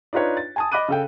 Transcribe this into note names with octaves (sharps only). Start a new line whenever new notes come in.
D4 D#4 F4 B4 C#5
A6
G#5 A5 D#6
D#5 B5 D6 F#6 D#7
C#3 A4 G5